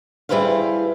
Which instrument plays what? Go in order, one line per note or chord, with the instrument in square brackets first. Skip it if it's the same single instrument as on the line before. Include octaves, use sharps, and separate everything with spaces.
[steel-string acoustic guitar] G3 E4 G#4 B4 C5 F5